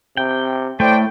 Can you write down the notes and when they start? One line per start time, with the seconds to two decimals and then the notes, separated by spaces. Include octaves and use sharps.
0.17 C3 G5
0.80 A2 A3 C5 D5 G5